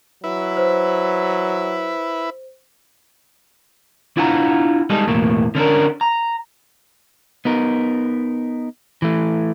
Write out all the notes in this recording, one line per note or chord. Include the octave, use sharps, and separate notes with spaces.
F#3 E4 B4
C5
D4 E4 F4 F#5 G5 A#5
G3 G#3 D#4 G#4 A4
B1 E2 A2 A3 A#3
D3 C#4 D4 A#4
A#5
B3 D#4 A#4
E3 A3